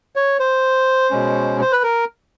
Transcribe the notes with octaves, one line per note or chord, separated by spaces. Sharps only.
C#5
C5
B2 G#3 C#4
C5
B4
A#4